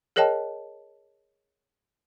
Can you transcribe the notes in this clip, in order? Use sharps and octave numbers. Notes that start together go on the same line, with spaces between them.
G#4 A#4 C#5 D#5 G5 A5